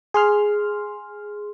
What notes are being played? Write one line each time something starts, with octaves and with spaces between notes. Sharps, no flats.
G#4 C6 F6